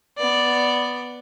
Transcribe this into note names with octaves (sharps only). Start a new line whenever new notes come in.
B3 D5